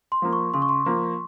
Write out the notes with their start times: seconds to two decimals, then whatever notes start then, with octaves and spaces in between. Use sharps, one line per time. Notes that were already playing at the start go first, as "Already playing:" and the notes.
0.12 C6
0.22 F3 A#3
0.33 C#6
0.54 C#3 C6
0.62 C#6
0.69 C6
0.85 F3 A#3 C6